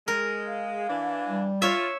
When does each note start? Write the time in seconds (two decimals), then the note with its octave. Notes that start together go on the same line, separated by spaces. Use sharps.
0.08 G#3 A#4
0.47 F5
0.89 E3 D4
1.28 G3
1.62 F4 C#5 E5